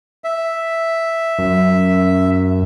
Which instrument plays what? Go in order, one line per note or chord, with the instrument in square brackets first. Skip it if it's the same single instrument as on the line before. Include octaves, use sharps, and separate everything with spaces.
[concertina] E5
[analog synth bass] F#2